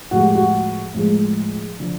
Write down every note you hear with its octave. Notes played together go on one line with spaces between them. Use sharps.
A2 F3 G#3 F#4
G4
F#4
A2 F3 G#3
D3 F3